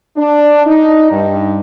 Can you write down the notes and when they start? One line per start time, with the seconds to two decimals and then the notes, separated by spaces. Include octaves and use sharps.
0.17 D4
0.66 D#4
1.11 G2